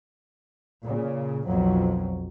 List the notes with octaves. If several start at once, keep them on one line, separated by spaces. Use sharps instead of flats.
A#2 C#3
B1 F2 F#3